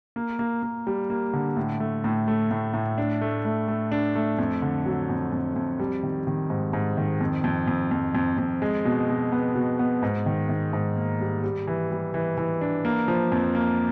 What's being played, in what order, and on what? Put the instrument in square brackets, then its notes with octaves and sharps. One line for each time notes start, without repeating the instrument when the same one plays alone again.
[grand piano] A#3
A#3
A#3
G3
A#3
D3
A2
A3
A2
A3
A2
A2
D4
A3
A3
A3
D4
A3
F2
D3
F#3
F2
F2
F2
G3
D#3
D#3
G#2
G#2
D#3
F2
F2
F2
F2
F2
F2
G#3
B2
B2
B3
B2
B3
G#2
D#3
D#3
G#2
A#3
G3
G3
E3
G3
E3
E3
D4
A#3
F3
F2
A#3